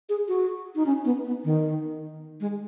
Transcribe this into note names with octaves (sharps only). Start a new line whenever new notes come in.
G#4
F#4
D#4
C#4
B3
B3
D#3
G#3